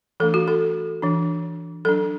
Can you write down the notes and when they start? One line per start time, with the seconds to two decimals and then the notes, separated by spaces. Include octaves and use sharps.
0.20 E3 A3 D4 A4
0.34 F#4
0.48 A4
1.02 E3 D4
1.85 F#3 D4 A4